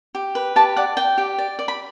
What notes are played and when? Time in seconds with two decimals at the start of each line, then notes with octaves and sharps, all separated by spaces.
0.15 G4
0.35 B4
0.56 G4 A5
0.77 D5 F#5
0.97 D5 G5
1.18 G4
1.38 D5
1.59 D5
1.68 B5